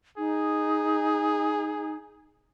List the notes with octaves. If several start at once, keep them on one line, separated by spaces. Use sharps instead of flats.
D#4 G#4